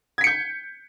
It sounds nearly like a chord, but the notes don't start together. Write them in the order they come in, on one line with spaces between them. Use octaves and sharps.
G#6 B6 C#7 G6